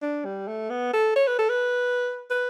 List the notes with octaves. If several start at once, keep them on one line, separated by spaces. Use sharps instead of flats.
D4
G3
A3
B3
A4
C#5
B4
A4
B4
B4